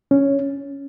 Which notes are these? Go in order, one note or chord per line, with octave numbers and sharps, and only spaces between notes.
C#4